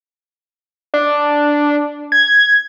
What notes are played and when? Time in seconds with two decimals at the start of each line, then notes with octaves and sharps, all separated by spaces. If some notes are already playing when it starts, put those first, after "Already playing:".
0.94 D4
2.12 G#6